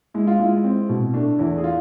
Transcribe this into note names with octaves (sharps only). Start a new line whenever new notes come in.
G#3 E4
F4
G#3 E4
C4
B2
A3 D4
E2 E4
G#4
F4